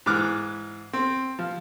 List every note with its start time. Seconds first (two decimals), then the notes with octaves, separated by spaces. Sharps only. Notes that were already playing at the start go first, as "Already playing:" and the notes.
0.06 G#2 E3 D6 F6 F#6
0.93 C4
1.39 F3